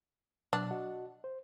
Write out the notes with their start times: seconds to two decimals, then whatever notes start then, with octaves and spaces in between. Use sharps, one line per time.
0.53 B2 F#3 D4 A5
0.71 F#4 D#5 F#5
1.24 C5